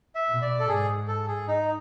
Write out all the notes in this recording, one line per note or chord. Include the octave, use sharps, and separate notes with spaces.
E5
B2
D5
A4
G#2 G#4
A4
G#4
D#4